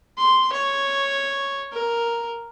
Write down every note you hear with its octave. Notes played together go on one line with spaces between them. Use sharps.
C6
C#5
A#4